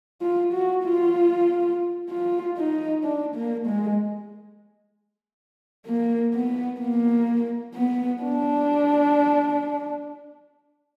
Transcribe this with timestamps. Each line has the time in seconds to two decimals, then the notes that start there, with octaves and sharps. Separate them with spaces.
0.22 F4
0.53 F#4
0.84 F4
2.10 F4
2.57 D#4
3.04 D4
3.35 A#3
3.67 G#3
5.87 A#3
6.34 B3
6.81 A#3
7.75 B3
8.22 D4